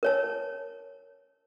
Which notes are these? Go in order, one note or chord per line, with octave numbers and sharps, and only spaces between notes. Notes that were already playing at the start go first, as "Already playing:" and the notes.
A#4 C#5 A5